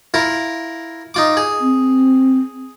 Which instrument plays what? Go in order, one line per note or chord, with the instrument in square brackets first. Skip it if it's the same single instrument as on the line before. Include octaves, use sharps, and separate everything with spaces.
[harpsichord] E4 F4 A#4
D#4 F4 D6
G#4
[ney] C4